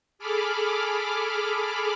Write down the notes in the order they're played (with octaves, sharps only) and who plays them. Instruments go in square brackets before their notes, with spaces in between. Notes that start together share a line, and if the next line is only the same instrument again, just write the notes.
[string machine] G#4 A4 B5 D6 F6